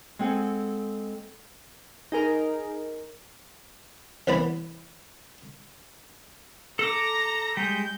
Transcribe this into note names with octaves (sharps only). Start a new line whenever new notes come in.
G#3 C4 A4 F#5 G#5
D#4 G#4 A#4
C2 E3 B3 D5 B5
A4 A#5 D6
G3 G#3 G6